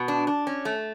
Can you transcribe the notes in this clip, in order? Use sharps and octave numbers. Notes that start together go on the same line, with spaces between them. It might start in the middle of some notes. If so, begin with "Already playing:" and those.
Already playing: B2
D4
D4
C#4
A3